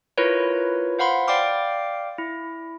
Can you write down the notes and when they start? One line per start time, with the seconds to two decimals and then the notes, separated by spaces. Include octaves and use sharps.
0.18 E4 F4 A#4 B4 C#5
0.99 C5 F5 F#5 B5 C6
1.27 D5 F5 G5 D6 F6
2.18 E4